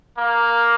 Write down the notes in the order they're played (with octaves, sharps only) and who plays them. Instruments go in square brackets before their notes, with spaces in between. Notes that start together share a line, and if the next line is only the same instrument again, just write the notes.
[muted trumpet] A#3